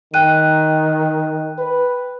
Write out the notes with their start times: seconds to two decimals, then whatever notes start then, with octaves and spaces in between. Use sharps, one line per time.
0.14 D#3 G5 F#6 D#7
1.58 B4